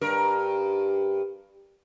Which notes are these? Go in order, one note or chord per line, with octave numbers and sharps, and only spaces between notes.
G2 A#4